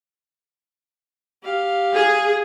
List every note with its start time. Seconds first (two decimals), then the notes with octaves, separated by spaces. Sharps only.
1.43 G4 F5
1.94 G#4